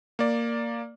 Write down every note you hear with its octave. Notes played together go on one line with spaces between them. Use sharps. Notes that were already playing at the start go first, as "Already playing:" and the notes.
A#3 D5